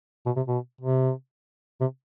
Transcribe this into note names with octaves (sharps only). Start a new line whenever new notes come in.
B2
C3
B2
C3
C3